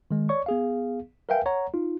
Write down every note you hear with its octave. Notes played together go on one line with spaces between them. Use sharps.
D#3 G#3
C#5 D5 C#6
B3 G#4 F5
A#4 B4 E5 F5 G5 G#5
C#5 F#5 A#5
D#4 F4